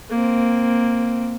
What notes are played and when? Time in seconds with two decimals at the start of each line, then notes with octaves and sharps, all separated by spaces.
0.10 A#3 C4